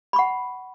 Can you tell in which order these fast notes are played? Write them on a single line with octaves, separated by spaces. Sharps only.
B5 C#6 F#5